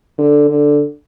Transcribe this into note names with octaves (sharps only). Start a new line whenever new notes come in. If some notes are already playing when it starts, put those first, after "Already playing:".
D3
D3